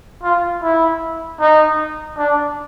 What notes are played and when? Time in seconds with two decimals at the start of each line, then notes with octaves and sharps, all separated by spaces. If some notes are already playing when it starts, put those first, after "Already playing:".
0.23 F4
0.62 E4
1.40 D#4
2.18 D4